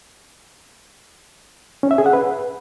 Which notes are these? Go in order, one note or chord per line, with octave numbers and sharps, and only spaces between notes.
C#4
E5
G#4
F#5
B4